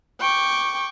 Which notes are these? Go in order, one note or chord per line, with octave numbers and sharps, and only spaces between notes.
G5 C#6 D6